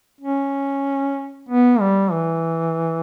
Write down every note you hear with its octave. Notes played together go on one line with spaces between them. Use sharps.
C#4
B3
G3
E3